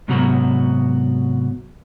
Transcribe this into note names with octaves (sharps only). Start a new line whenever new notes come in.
G#2 C3 F#3 B3 F#4 A#5